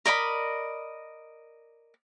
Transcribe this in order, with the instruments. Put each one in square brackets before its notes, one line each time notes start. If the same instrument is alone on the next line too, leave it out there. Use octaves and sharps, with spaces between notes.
[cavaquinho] A#4 D5 D#5 B5